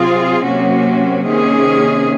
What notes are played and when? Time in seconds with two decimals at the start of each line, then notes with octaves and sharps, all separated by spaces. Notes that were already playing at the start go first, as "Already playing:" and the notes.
Already playing: C3 F#3 C4 F4 G#4
0.44 C3 F#3 A#3 C#4 F#4
1.26 C3 D#3 A#3 C#4 G#4